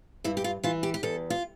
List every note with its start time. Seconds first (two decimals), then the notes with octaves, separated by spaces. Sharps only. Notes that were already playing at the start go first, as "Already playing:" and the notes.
0.24 G2 E4
0.37 G4
0.44 F4
0.64 E3 F4
0.83 G4
0.94 G4
1.03 E2 A4
1.30 F4